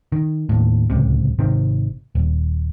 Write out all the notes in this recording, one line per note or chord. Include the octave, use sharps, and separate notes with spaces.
D#3
D#2 A2
D1 C#2 C3
G#1 C3 D#3 C4
D#1